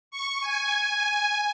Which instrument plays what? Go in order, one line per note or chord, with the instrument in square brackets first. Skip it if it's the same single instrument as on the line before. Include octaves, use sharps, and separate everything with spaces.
[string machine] C#6
G#5